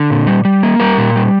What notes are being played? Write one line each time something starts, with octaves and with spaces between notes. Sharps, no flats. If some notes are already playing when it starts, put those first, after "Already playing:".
Already playing: D3
A#2
G3
G3
A#3
G3 A#4
A#2
G3